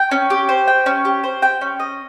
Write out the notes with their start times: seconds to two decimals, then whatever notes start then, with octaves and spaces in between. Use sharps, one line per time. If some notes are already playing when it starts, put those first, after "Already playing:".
Already playing: G5
0.11 C#4
0.30 G4
0.49 C5
0.68 G5
0.86 C#4
1.05 G4
1.24 C5
1.42 G5
1.61 C#4
1.80 D#5